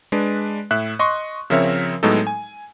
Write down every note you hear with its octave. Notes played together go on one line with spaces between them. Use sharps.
G#3 D4 B4
A2 E5 F#6
D#5 C6 C#6
C#3 F3 C4 A#4 C#5 E5
A2 F#3 G#3 B3 D#4 A4
G#5